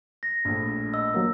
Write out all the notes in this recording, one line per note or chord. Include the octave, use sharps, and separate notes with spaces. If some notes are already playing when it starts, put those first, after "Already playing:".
A#6
A#1 A2
D#5 E6
F#3 A#3